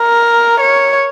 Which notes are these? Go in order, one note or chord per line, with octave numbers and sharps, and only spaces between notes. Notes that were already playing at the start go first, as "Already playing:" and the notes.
Already playing: A#4
C#5